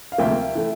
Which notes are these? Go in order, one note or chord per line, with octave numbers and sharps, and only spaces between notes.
F5
D2 C3 F3 A#3 E5 G5
E3 A3